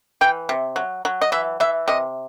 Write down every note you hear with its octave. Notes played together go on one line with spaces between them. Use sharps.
E3 G5
C3
F#3
F#3
D#5
E3 E5
E3 E5
C3 D#5